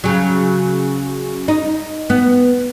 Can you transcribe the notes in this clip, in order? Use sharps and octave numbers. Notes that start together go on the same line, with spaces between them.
C#3 F#3
D#4
B3